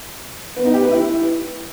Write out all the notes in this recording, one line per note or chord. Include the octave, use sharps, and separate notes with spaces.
B3
D#4
G4
B4
E4